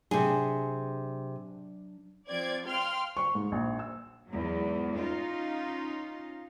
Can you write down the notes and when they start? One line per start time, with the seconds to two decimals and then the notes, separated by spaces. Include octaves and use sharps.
0.11 C3 F#3 D4 G#4
2.27 F3 C4 D5 G#6
2.67 F5 G5 C6 F6
3.17 C#6
3.35 G#2
3.52 A#1
3.79 E6
4.29 E2 G#2 F#3
4.94 C#4 D#4 F4